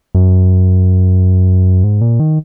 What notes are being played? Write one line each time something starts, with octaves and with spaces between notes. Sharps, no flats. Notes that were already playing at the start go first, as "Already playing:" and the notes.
F#2
G#2
A#2
D#3